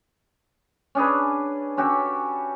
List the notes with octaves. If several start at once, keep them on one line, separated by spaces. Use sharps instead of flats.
C#4 D4 G#4 B4
C#4 F#4 G4 A4